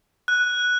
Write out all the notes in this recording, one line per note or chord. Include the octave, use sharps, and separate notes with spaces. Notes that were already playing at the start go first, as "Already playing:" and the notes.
F#6